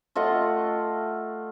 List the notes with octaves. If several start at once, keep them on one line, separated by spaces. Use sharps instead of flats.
A3 F4 D#5 F#5